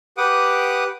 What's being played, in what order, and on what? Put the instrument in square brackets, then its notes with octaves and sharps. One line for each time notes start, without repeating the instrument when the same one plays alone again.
[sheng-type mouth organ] G4 B4 F#5 D6 D#6